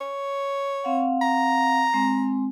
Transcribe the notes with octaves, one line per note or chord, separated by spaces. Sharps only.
C#5
C4 F5 F#5
A#5
G#3 C4